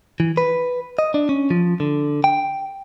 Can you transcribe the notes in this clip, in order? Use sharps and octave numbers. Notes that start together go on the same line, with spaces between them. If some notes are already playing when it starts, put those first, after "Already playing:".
E3
B4
D#5
D4
C#4
F3
D3
G5